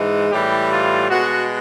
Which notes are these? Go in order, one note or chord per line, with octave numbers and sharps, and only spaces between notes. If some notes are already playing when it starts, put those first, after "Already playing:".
Already playing: G#2 E3 G#3
A2 E3 G3 G4
F4
B2 G#3 F#4